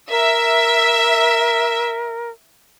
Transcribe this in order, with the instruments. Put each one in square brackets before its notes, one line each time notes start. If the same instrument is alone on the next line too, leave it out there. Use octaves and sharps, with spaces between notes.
[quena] A#4 [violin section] E5